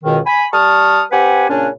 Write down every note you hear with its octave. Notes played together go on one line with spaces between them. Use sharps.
C#2 B2 D#3
G#5 B5
G3 A5 C#6 D#6 F6
C4 G4 B4 F#5 G#5
A#2 C#3 C#4 D4